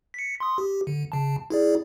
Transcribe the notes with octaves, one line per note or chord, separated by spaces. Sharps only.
B6 C#7
C6 D#6
G4
D3
C#3 A5
E4 G#4 D5